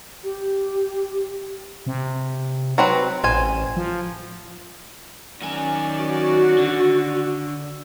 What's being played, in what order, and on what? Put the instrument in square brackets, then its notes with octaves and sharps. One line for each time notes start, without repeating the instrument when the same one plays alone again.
[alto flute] G4
[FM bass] C3
[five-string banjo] F#3 C4 B4
[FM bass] A1 [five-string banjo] C5 G#5
[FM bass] F3
[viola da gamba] D#3 C#4 D5 [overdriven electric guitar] F#3 G#5
[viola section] F#4
[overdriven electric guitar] D3